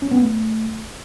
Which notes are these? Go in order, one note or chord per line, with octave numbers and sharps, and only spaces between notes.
C#4
B3
A3